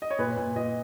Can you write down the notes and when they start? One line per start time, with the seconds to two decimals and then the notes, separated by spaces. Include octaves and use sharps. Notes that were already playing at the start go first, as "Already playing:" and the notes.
0.02 D#5
0.11 C#5
0.19 A#2 B4
0.37 A#2
0.56 A#2 D#5